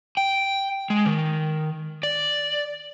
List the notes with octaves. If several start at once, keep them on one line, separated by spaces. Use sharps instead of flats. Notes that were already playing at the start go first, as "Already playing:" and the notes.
G5
G#3
D#3
D5